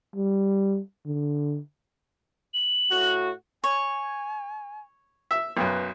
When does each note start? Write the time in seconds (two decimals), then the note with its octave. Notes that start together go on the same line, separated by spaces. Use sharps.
0.16 G3
1.06 D3
2.54 F#7
2.90 A2 F#4
3.64 C#5 G#5
5.31 E5
5.57 B1 F#2 B4